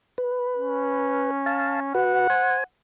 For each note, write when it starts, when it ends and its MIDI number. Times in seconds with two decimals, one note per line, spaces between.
0.18 1.31 71
0.57 1.91 61
1.46 1.80 77
1.46 1.80 81
1.95 2.27 66
1.95 2.27 71
1.95 2.62 78
2.30 2.64 72
2.30 2.64 80